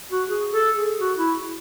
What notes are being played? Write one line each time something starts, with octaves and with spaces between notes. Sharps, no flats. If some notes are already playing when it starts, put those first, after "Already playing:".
F#4
G#4
A4
G#4
F#4
E4